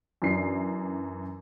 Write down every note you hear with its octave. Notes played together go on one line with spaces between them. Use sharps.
F#2 E3 D4 C7